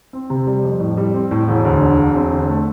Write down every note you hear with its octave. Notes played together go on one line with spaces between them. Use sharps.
C4
C3
G3
F2
A2
G3
C4
A2
E1
D2
D3
E1
C4
D3
A3